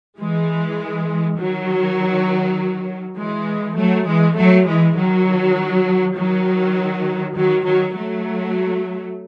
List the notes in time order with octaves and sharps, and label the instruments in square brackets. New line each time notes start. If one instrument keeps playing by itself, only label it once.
[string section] E3 G#3
D#3 F#3
E3 G#3
F#3 A3
E3 G#3
F#3 A3
E3 G#3
D#3 F#3
D#3 F#3
D#3 F#3
D#3 F#3
F#3 A3